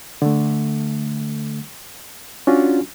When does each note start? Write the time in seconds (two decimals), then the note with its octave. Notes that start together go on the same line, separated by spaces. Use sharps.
0.22 D3 A3
2.47 C#4 D4 F4 F#4